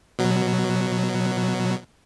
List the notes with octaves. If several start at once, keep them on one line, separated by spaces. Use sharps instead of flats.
B2 F#3